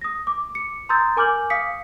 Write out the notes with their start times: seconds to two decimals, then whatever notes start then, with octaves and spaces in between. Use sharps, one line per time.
0.01 D#6 A#6
0.27 D6
0.55 C#7
0.89 A#5 C6 D#6 E6 G6 A6
1.17 A#4 G#5 D6 F6 G6 F#7
1.50 F5 D#6 B6 C#7